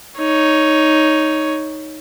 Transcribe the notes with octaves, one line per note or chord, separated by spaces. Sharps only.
D#4 C#5